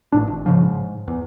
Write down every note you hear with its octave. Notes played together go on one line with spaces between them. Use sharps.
A1 A2 D4
G#1
G#2 C#3 F3
G#2
E2